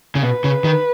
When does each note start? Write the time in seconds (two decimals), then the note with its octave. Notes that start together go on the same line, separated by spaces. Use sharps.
0.15 C#3
0.23 B2 B4
0.44 C#3
0.64 D#3